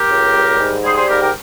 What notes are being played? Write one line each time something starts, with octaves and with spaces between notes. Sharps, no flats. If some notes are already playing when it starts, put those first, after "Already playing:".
Already playing: G4 A#4
C#2
G3
G#2
G3 G#4 C5
G#4 C5
G#2 G4 A#4
G4 A#4